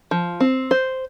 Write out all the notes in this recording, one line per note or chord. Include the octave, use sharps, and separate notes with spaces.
F3
C4
C5